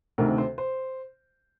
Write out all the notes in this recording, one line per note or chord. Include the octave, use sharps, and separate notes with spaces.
D2 C3 D#3 A#4
C5
C5